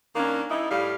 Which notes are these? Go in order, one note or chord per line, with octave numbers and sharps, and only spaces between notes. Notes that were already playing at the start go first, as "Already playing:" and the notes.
D#3 A#3 C#4 D4
G3 D#4 E4
A2 G3 F5